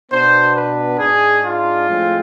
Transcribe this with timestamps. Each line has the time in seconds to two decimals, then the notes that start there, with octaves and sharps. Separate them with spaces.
0.12 B2 B3 D4 C5
0.55 B4
1.00 G#2 G#3 D4 G#4
1.45 F4
1.89 A2 F3 G#3 C4